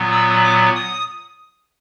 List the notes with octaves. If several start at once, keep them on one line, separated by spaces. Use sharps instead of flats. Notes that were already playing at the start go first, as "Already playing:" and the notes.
Already playing: A#2 F#3 B3
E6
D6
D#6